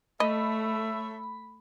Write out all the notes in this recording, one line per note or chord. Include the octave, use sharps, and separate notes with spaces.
A3 A4 C#5 D#5 E5 B5